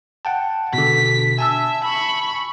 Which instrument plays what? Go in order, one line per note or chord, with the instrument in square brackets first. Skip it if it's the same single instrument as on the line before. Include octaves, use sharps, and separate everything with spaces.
[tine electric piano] F#5 G5 A5
[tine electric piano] B2 D3 [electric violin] B6
[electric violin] E5 [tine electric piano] G#5 A5 E6
[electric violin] B5 C#6